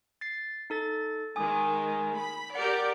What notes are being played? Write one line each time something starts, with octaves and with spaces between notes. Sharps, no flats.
A6 C7
D#4 A4 A6
D#3 G#3 G#5 D6 D#6
B5
G4 A#4 D5 F#5